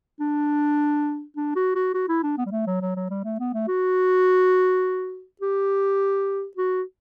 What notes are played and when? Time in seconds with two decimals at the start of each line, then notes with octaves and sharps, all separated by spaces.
0.20 D4
1.36 D4
1.56 F#4
1.75 F#4
1.94 F#4
2.09 E4
2.23 D4
2.38 B3
2.46 G3
2.51 A3
2.67 F#3
2.82 F#3
2.96 F#3
3.10 G3
3.24 A3
3.39 B3
3.54 A3
3.68 F#4
5.41 G4
6.57 F#4